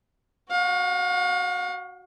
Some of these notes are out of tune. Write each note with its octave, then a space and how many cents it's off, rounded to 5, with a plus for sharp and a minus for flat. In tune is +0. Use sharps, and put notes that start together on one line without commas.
F#4 +0 F5 +40